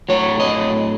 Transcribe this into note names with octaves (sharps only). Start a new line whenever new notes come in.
A2 F#3 C#5
D#5